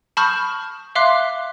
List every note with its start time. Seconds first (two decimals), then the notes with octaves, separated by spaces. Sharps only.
0.17 A5 B5 C#6 D#6 F6 G6
0.95 E5 F5 C6 D6 F#6